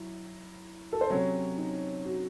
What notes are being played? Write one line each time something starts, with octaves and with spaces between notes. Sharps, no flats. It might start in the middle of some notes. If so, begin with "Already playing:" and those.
Already playing: F#3 E4
A4
C5
C3 F#3 C#4 C#5
D#4
F#4